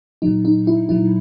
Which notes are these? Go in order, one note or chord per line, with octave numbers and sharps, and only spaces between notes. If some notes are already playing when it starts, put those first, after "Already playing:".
A#2 F#3 D#4
D#4
E4
A#2 F#3 E4